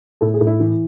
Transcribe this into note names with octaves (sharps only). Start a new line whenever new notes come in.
A2 A4
G#4
A2
E4
E3